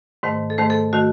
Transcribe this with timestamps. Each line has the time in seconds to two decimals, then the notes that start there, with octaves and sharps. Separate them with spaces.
0.23 G#2 D#3 A3 C5
0.50 A4
0.58 G#2 D#3 A3 C5
0.70 A4
0.93 D#3 A3 F#4